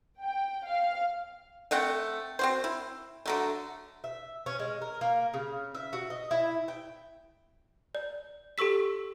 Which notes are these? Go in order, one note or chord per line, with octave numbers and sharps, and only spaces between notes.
G5
F5
A3 C4 F#5 G5
C4 F#4 C5
E4
D3 F#3 A3
E5
C#4
G#3
A#4
A#3
C#3
E5
F#4
D#5
E4
G5
D5
G4 A4 C#6 E6 B6